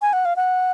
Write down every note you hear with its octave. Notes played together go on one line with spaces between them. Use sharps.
G#5
F#5
F5
F#5